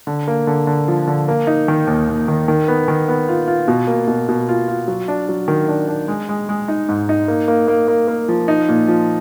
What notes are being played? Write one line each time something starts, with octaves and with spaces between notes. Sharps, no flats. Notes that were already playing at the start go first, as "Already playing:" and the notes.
D3
A#3
D3
D3
F3
D3
A#3
D#4
D#3
D#2
D#2
D#3
D#3
B3
D#3
B3
F4
F4
B2
A#3
B2
B2
F4
F4
F#3
D4
F#3
D#3
D4
D4
G#3
G#3
G#3
D#4
G#2
D#4
A#3
A#3
A#3
A#3
A#3
F3
D#4
A#2
F3